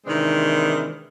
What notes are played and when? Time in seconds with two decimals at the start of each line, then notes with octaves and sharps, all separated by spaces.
0.06 C3 D#3 E3 G#3 C4 D4